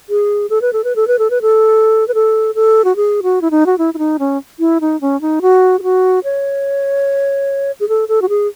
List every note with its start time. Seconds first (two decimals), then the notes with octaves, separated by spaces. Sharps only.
0.09 G#4
0.50 A4
0.61 B4
0.73 A4
0.84 B4
0.96 A4
1.07 B4
1.19 A4
1.30 B4
1.42 A4
2.08 B4
2.14 A4
2.55 A4
2.84 F#4
2.96 G#4
3.23 F#4
3.41 E4
3.51 D#4
3.66 F#4
3.78 E4
3.94 E4
3.98 D#4
4.19 C#4
4.59 E4
4.81 D#4
5.01 C#4
5.21 D#4
5.42 F#4
5.79 G#4
5.82 F#4
6.24 C#5
7.80 G#4
7.89 A4
8.08 A4
8.22 F#4
8.29 G#4